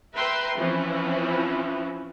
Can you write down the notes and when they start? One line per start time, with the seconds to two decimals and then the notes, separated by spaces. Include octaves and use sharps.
0.14 B4 E5 G5 A#5 C6
0.56 E3 F3 C4 C#4 E4